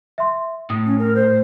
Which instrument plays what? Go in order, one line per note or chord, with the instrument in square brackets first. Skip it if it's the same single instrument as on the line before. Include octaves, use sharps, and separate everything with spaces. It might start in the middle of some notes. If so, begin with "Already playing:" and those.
[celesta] E5 C6
[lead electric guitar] A2 [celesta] D#6
[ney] C#4
A#4
C5